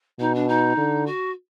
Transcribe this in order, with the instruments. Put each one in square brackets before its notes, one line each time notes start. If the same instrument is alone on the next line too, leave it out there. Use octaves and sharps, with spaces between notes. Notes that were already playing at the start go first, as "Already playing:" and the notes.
[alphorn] B2 [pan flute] D#4
[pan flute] D4
D#4
[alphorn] D3
[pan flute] F#4